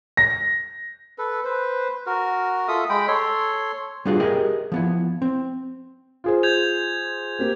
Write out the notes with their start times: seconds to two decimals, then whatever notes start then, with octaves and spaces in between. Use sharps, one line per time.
0.17 A#6
1.18 A4 B4
1.45 B4 C5
2.06 F#4 A#4
2.68 F4 A4 E5 D#6
2.89 G#3 G5 B5
3.08 A4 C#5 C6
4.05 G3 B3 D4 F4 F#4 G#4
4.20 G4 G#4 A#4 D#5 E5 G5
4.72 F3 B3 E4
5.22 C4
6.24 F4 G#4 C5
6.43 G6 G#6 F7
7.39 A#3 C4 G4